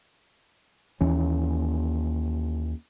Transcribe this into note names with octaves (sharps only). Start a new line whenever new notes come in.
D#2 E3 C#4